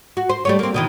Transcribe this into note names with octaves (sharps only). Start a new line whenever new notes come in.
F#4
C5
G3 A3 C#5
A#3 C4
B2 D#3 E3